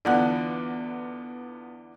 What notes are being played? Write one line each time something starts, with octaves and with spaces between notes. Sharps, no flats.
E2 D3 B3 F4 D5 F#5 A5 F#6